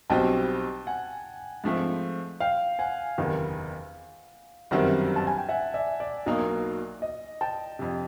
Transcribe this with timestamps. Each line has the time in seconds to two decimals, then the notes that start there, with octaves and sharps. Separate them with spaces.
0.10 B1 B2 G3 C4 G5 A5
0.87 F#5 G#5
1.64 G#2 F3 A3 C4
2.40 F5 G5
2.79 F#5 G#5
3.18 F#1 E2 C3 D#3
4.71 G1 F#2 D#3 G3 C4 E5 F#5
5.16 A5
5.27 G#5
5.38 G5
5.49 E5 F#5
5.74 D5 E5
6.00 D5
6.26 B1 B2 F#3 A#3 D#4
7.02 D#5
7.41 G5 A5
7.79 F2 C3